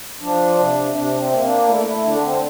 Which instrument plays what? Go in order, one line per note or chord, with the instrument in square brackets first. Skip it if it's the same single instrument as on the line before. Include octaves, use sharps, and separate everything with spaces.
[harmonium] F3 D4
C3
C3 D4
D4
C4
A#3
D4
A3 E4
D4
E4
D3 D4
C4